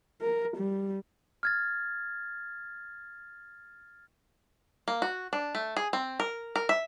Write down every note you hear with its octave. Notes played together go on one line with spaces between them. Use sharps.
A#4
G3
F6 G#6 A6
A#3
F#4
D4
A3
G#4
C4
A#4
A#4
E5